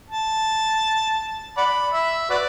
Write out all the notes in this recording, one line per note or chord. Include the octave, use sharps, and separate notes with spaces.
A5
D5 F#5 B5
E5
F#4 B4 D5